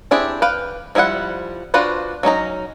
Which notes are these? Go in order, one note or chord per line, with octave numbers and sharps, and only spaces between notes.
C4 D4 E4 G4 G#4
B4 F5 G5
F3 G3 E4 G#4 F#5
D4 F4 F#4 B4 C5
F#3 C#4 D#4 A#5